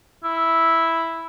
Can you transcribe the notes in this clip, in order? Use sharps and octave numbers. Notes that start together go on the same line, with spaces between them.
E4